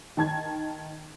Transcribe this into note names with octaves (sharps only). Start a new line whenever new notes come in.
D#3 A5 G#6